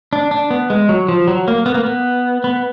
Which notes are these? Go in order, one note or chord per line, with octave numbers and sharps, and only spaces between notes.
D4
D4
B3
G#3
F#3
F3
F#3
A#3
B3
A#3
B3
B3